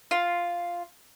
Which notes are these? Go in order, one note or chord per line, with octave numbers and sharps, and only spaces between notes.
F4